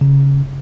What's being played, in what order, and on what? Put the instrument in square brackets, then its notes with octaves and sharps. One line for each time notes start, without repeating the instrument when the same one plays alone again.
[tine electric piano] C#3